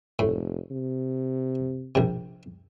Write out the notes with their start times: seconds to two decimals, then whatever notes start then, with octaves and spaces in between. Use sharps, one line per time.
0.19 F1 A2
0.71 C3
1.95 A#1 C3